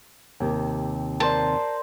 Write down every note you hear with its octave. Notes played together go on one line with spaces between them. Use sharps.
D#2 C3
A#4 C5 D5 A5